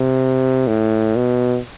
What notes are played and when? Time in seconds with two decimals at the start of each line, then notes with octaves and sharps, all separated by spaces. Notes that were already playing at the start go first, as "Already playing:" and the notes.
Already playing: C3
0.68 A2
1.16 B2